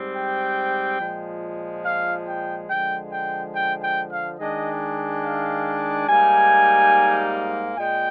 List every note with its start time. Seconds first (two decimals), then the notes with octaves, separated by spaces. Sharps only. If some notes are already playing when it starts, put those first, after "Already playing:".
Already playing: G#2 G3 C4
0.15 G5
0.99 A#2 F3 G#3
1.84 F5
2.27 G5
2.69 D3 F3 G#3 G5
3.11 G5
3.54 G5
3.82 G5
4.10 F5
4.39 D#3 G#3 D4 D#5
5.23 F5
6.08 G#2 G3 A#3 D#4 G#5
7.77 A#2 G#3 G5